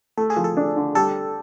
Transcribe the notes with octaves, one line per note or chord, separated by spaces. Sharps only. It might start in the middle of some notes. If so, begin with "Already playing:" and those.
A3 A4
G#4
F3
A4
D4
D3
G3 A4